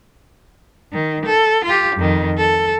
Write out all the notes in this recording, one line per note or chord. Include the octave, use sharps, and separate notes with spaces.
D#3
A4
F4 G4
F2 D#3
A4